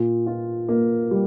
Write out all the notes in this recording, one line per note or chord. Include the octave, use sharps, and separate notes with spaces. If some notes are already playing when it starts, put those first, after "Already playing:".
Already playing: A#2
F4
A#3
G3